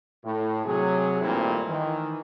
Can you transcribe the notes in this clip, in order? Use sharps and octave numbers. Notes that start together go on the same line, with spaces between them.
A2
C3 F#3 G#4
G#1 G2 A#2 A3 C4 E4
D#3 E3